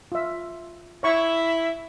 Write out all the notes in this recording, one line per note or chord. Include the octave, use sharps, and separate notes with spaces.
F4 E5
E4 C#5 E5 C#6